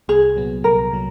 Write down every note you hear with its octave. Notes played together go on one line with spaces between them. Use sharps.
C2 G#4
A#2 F#3 B3
C2 A#4
A#2 F#3